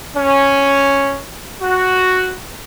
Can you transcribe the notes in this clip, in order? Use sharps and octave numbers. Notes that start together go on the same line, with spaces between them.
C#4
F#4